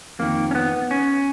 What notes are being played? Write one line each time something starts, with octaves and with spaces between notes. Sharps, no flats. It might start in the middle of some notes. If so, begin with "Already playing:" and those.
F2 D#3 A#3
C#4
B3
C#4